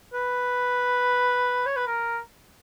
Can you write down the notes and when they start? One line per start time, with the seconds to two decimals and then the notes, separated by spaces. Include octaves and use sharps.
0.13 B4
1.66 C#5
1.76 B4
1.87 A#4